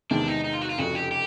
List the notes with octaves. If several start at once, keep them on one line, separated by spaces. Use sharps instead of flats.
E2 C3 D#3 G#3 D4
D#4
D#4
F4
F#4
F4
F1 F2 C#3 F#4
G4
G4